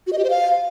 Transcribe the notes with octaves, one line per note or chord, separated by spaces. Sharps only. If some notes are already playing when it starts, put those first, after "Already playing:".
F#4
D#5
G4
C5
F5